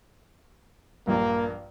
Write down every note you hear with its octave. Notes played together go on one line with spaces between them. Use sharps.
A#1 G2 A#3